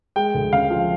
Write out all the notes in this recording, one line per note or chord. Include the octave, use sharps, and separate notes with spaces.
G#3 G5
D2
C#3 F5
F3